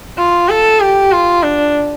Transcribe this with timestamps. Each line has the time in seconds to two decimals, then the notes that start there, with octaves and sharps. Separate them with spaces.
0.18 F4
0.50 A4
0.80 G4
1.12 F4
1.43 D4